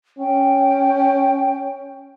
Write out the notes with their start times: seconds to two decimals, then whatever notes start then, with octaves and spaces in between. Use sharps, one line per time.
0.19 C#4 G5